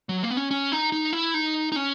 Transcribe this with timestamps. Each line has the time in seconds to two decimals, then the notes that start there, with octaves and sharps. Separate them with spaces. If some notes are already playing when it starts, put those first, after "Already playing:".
0.09 F#3
0.23 A#3
0.30 B3
0.37 C#4
0.51 C#4
0.72 D#4
0.92 D#4
1.13 E4
1.34 D#4
1.72 D#4
1.76 C#4